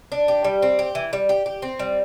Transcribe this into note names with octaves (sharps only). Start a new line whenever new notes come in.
D4
G4
G3
C4
G4
E3
G3
G4
G4
C4
G3